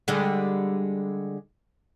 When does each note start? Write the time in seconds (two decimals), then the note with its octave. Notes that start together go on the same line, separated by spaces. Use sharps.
0.08 D3 G3 G#3